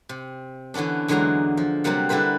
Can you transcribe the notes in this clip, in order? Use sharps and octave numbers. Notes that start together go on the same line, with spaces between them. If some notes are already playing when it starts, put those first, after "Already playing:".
C3
D3 E3 B3 C#4 D4
E2 D3 E3 F#3 G#3 A#5
F3
C3 F#3 G3 A#3 F#5
D3 G3 E4 B4 C5